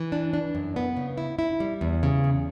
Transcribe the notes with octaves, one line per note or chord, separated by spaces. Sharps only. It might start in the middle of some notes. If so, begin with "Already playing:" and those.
Already playing: E3
D4
D4
F#2
B3
C#3
E4
E4
G3
E2
C#3
E2